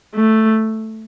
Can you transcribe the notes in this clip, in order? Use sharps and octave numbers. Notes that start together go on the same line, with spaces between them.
A3